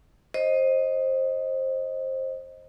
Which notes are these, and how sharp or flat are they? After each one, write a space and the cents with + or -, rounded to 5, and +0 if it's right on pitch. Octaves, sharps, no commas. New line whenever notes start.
C5 +20 D#5 +0